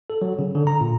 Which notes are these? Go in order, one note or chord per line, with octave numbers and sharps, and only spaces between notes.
A4
F#3
C#3
D3
A#5
A#2